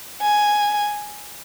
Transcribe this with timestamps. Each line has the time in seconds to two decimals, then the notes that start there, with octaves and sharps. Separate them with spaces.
0.22 G#5